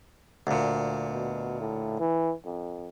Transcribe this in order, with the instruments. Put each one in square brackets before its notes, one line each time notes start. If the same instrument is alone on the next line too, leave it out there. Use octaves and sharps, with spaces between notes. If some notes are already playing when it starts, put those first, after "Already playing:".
[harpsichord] D2 A#2
[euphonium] B2
A2
E3
F2